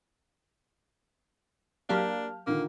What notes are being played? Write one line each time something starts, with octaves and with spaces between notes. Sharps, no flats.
F#3 A#3 D4 G4 F5 A5 F6
D3 D#3 A#3 F4